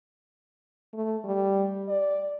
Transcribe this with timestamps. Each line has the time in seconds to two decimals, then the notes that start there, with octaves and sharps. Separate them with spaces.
0.94 A3
1.25 G3
1.88 D5